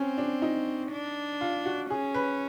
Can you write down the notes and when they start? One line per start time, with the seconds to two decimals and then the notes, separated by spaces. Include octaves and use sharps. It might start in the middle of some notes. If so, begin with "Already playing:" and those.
Already playing: C4 C#4
0.18 D4
0.42 D#4
0.92 D4
1.41 F4
1.66 F#4
1.90 C#4 G#4
2.14 B4